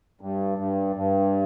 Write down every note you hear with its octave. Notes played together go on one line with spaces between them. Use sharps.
G2
G2
G2